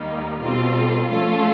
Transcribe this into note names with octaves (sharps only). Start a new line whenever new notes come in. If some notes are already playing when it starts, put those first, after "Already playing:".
Already playing: D#2 D#3 G3 A#3 D#4
B2 G3 C4 F4 A4
F3 A3 C#4 F4 A4